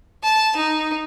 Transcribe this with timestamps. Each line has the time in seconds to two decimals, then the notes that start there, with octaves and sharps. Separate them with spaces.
0.23 A5
0.56 D#4